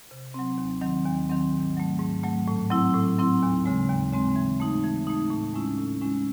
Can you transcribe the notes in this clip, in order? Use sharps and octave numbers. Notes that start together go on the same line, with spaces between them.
C3
F#3 C4
D#2
D#3 F#3 C4
D#2
D#3 F#3 C4
G#2
F#3 A3
G#2
F#3 A3
A2
F#3 C4 E4
A2
F#3 C4 E4
D#2
C#3 G#3 C4
D#2
C#3 G#3 C4
E3
A3 D#4
E3
A3 D#4
A2
G#3 C#4 E4
A2
G#3 C#4 E4